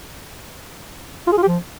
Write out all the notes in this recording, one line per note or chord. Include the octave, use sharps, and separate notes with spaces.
F4
G#4
F4
G4
F3